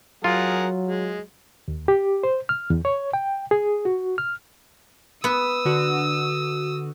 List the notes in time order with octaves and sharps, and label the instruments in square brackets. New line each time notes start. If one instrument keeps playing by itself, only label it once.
[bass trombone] F#3 [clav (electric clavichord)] F4 [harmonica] G#4 A#4 F#5
[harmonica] G#3
[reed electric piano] D#2
G4
C5
F6
E2
C#5
G5
G#4
F#4
F6
[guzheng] B3 B4 [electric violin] D#6 E6
[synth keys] D3 F#4